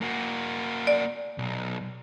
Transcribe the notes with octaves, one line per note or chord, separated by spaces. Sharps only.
A#3 F#4
D5
B1